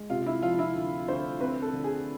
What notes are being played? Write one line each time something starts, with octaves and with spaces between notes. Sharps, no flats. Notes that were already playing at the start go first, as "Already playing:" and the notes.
Already playing: G#3
C3 F4
E4
F3 F4
E4
D2
D2 C5
C4 B4
A4
D3
G#4